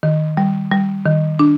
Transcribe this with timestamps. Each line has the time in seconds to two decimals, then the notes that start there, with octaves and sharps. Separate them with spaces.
0.03 D#3
0.37 G3
0.71 G3
1.06 D#3
1.39 D4